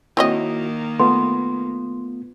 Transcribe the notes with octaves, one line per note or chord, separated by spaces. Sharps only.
D#3 A#3 C4 E4 F#4 C#5 D#5
A3 B3 F4 C6